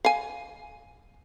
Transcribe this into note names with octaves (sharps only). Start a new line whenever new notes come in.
F5 G#5